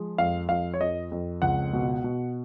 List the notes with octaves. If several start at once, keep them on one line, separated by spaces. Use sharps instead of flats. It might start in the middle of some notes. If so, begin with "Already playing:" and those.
Already playing: F3 G#3
F2 F5
F2 F5
C#5
F2 D#5
F2
C#2 F#5
B2
B2